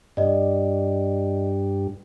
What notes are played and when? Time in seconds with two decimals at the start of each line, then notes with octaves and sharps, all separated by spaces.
0.17 G2 D5 D#5